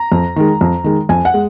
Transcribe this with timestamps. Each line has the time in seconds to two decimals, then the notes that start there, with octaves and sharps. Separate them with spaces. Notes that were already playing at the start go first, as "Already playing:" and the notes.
Already playing: A#5
0.12 F2
0.36 D#3 G#3
0.61 F2
0.84 D#3 G#3
1.09 F2 G#5
1.25 F#5
1.34 G#3